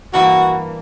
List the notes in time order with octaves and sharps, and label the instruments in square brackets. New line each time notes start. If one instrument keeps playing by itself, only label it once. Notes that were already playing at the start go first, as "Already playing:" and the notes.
[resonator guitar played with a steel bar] G2 E3 A#3 [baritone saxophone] F#4